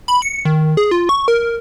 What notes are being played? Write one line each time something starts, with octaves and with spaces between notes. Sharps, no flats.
B5
C#7
D#3
G#4
F4
C#6
A#4